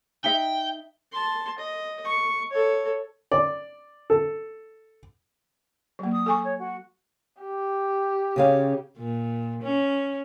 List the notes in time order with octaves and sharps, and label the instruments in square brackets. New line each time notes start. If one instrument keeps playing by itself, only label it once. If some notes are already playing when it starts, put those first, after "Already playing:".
[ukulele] D#4 E5 [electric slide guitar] G5
[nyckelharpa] A5 C6
D#5
C#6
A4 C#5
[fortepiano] D5
A4
[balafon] F#3 A#3
[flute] D#6
[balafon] A4 G#5 C#6
[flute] C#5
F#4
[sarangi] G4
[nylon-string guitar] C#3 C#4 F5
[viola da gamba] A#2
C#4